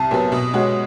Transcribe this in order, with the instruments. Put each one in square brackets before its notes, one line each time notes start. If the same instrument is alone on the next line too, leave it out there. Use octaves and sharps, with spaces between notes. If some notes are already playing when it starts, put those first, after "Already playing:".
Already playing: [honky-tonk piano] C2 [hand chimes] A5
[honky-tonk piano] A#2 F#3 B3
B2
G#3 C#4 F#4